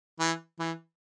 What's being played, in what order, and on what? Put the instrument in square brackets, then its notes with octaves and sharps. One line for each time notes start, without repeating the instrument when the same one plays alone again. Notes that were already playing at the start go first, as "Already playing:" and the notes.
[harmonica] E3
E3